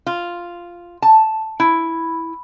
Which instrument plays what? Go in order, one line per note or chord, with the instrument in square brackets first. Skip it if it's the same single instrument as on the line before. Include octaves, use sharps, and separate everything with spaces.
[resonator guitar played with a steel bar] F4
A5
E4